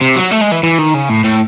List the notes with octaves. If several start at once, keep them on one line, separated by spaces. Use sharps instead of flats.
C3
F#3
A3
G#3
E3
E3
D#3
C#3
A2
A2